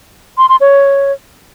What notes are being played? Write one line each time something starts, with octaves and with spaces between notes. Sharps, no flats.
C6
C6
C#5